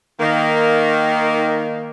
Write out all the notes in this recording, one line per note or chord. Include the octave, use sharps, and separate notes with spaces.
D#3 A#3